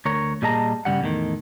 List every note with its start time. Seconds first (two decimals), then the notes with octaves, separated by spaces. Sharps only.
0.05 D2 A#4 C#5
0.42 A#2 G3 G#4 D#5 A5 A#5
0.85 G2 C#3 G3 F#5
1.01 E2 A2 D#3